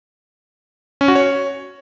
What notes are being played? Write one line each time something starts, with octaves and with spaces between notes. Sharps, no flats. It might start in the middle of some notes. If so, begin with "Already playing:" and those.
C#4
F#4
C#5